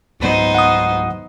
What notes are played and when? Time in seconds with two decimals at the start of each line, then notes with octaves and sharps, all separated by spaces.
0.20 C#2 G#2 F#3 B3 D#4 C5
0.55 F#5 D#6